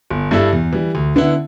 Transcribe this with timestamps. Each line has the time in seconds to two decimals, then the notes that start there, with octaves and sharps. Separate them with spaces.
0.10 G1
0.31 G2 G3 E4 A4
0.53 E2
0.73 E3 G3
0.95 D2
1.16 D3 B3 E4